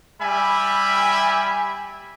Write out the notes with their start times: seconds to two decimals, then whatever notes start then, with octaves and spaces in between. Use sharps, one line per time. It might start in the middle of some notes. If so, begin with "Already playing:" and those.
0.22 G3 E5 G#5 B5